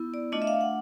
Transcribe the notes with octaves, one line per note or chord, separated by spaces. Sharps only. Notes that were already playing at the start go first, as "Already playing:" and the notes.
Already playing: B3 E4
D5
A3 D4 F4 D#5
E5
F5
F#5